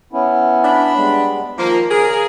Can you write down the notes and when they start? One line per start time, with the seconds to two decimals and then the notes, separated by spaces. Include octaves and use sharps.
0.13 B3 C#4 E4
0.64 D4 B5
0.95 G3 G#3 B3
1.58 D#3 F3 A#3
1.90 C#3 G#4 A#4